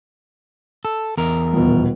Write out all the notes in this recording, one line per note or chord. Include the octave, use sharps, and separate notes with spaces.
A4
E2 A#4
D#1 B2